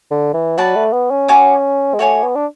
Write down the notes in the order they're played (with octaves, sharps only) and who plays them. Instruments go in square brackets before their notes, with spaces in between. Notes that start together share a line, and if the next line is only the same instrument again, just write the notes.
[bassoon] D3
E3
[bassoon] F#3 [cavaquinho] F#4 B4 D5 A5
[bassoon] A3
B3
C#4
[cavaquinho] F#4 C#5 G#5 D6
[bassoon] G#3
[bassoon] A3 [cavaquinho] F#4 C#5 G#5 D6
[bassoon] B3
D4